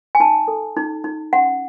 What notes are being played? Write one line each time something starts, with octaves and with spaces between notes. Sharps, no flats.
G#5
D#4 A5
A4
D#4
D#4
C#4 F#5